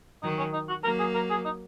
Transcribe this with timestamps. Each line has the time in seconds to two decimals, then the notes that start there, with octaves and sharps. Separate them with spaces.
0.23 D#3 F#3 D#4
0.38 C#4
0.53 D#4
0.69 F#4
0.84 F#3 A#3 A#4
0.99 G#4
1.14 A#4
1.30 G#4
1.45 D#4